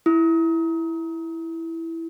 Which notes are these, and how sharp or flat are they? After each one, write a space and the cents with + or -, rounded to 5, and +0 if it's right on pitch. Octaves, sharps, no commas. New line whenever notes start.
E4 +0 D#6 +40